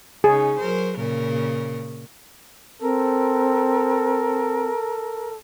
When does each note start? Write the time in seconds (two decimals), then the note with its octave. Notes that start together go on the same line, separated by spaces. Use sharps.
0.24 C#3 C#4 D#4 G#4
0.58 F#3 A#4 C5
0.98 A#2 C#3 A#4
2.81 C4 A4 A#4